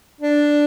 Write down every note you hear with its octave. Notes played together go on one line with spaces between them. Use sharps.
D4